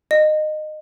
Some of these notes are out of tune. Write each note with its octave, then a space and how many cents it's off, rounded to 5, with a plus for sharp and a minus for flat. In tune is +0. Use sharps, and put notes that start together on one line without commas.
D#5 -20